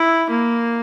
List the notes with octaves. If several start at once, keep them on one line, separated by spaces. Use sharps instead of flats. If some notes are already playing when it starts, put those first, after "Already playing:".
Already playing: E4
A#3